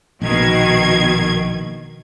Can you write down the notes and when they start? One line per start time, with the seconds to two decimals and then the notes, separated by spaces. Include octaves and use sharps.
0.22 A#1 B2 D#3 G#6